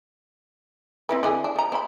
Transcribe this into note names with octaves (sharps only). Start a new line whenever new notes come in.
C4 E4 B4
D3 E4 G#4
D4
F3 A#5
C4 B5